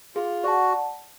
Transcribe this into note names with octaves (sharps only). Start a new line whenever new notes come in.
F4 G#4
F#4 D5 F#5 A5